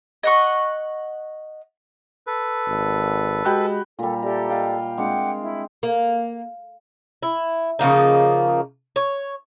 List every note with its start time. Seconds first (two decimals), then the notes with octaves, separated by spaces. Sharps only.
0.23 D#5 F#5 C#6
2.27 A4 B4
2.68 G#1
3.45 G#3 F#4 G4 B5
3.99 A#2 G3 A4
4.22 G4 A4 D5 E5 A#5
4.50 D#5 F5 G5
4.98 G#3 C4 D4 F#5 G5 D6
5.42 E4
5.83 A#3
7.23 E4
7.79 C#3 F3 A#3 D#4
8.96 C#5